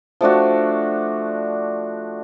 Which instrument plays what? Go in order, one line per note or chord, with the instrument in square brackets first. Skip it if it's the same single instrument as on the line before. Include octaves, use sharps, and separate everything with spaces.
[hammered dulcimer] F3 A3 D4 F#4